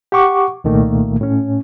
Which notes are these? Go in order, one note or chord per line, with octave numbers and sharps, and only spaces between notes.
G4 F#5 C#6 D6
C2 A#2 D#3 A3 A#3
A2 C#4